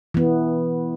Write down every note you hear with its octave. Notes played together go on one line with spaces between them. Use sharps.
E3 B3